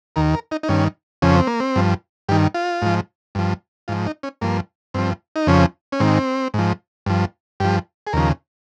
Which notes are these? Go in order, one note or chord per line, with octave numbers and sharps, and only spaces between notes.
D#2 D#3 A#4
A#4
D#4
D#4
G2 D#3 C#4
F2 C#3 F3 C#4
C4
A#3
C4
G2 F3
G2 D#3 G4
F4
G#2 F3
G2 F3
G#2 F3 F4
D#4
C#4
G2 F3 A#3
G2 F3 C4
D#4
F2 C#3 F3 C#4
C#4
G#2 D#3 C4
G#2 F3
G2 F3
G2 F3 G4
G#4
D#2 C#3 F3 A#4